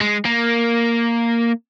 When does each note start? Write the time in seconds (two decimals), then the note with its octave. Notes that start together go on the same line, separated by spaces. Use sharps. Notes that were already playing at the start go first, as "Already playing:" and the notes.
0.01 G#3
0.25 A#3